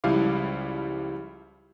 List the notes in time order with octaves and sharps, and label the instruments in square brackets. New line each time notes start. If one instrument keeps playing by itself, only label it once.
[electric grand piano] C#2 F3 G3 E4 F5 D6